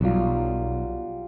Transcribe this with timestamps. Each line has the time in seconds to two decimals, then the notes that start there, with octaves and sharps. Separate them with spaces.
0.01 B1 F#3 G3 F4